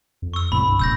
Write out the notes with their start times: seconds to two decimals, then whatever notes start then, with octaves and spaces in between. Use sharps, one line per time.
0.22 F2
0.34 C#6 E6
0.52 C2 A2 B5
0.67 G2
0.79 D1 A#1 E6 G6 A#6